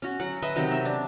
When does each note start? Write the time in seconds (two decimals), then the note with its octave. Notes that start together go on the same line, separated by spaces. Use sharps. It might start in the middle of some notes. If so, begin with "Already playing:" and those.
0.02 C#4 F#4
0.20 F#3 F#5
0.42 B4 D#5 E5
0.56 C3 D#3 F#3
0.71 E5
0.85 D4